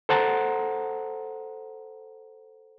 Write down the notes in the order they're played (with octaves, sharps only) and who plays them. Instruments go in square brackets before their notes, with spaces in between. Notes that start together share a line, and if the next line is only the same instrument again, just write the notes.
[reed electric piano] A4 C5 F#5 A5 A#5